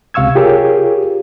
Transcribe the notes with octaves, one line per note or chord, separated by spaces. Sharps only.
C#2 C3 F5 C#6 E6 G#6
F4 G4 G#4 A#4 C#5